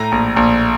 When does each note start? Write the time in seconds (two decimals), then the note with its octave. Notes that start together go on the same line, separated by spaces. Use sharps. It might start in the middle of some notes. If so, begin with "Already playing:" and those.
Already playing: A2 A#5
0.12 A#1
0.36 A#1